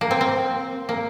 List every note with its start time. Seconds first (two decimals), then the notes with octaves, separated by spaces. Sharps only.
0.01 A#3
0.11 C4
0.21 C4
0.89 A#3